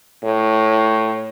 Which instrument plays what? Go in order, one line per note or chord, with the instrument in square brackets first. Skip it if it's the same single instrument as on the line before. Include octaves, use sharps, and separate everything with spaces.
[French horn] A2